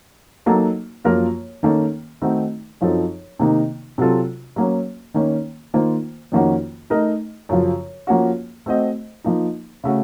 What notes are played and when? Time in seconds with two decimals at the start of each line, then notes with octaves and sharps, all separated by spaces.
0.46 F#3 A#3 D#4 A4
1.04 F#2 F3 A#3 F4 A#4
1.63 D#3 A#3 C#4 A4
2.22 D#3 A3 C4 D#4 F#4
2.81 F#2 F3 C4 D#4 A4
3.39 C3 D#3 A#3 D#4
3.98 C3 F#3 C4 F4 A4
4.56 F#3 A#3 C#4
5.14 D#3 A#3 C#4
5.74 D#3 A#3 F4 C5
6.32 F2 D#3 A#3 C#4 F#4
6.90 A3 D#4 A#4 D#5
7.49 F#2 C#3 F3
8.07 F3 A#3 C#4 F#4
8.66 A3 C4 F#4 C5 D#5
9.24 F3 A#3 D#4
9.84 C#3 A3 C#4 F#4